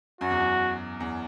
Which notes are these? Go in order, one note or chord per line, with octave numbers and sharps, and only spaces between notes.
F#2 F#4
E2
F#2
E2